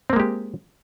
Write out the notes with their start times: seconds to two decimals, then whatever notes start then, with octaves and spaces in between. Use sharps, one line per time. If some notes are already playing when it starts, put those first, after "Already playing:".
0.10 C4
0.13 A#3
0.16 G#3
0.20 G4